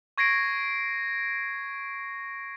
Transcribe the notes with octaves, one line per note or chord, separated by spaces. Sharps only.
C#6 G#6 A#6 C7 D7